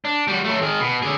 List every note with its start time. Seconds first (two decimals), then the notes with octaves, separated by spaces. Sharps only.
0.05 D4
0.28 G3 F#4
0.44 F#3 A3
0.62 D#3 G#4
0.80 B2
1.03 D3 G#4